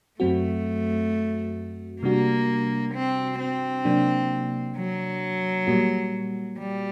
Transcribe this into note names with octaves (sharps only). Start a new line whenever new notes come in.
F#2 F#3 A3 C4 F#4
C3 G3 A#3 D4 F#4
C4
C4
C3 F#3 A#3 D4
F#3
A#2 G3 A#3 F#4
G3